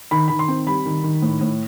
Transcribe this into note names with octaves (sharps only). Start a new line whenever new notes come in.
D#3 B5
D#3 B5
C6
C4
G3 B5
D#3
D#3
A2
A2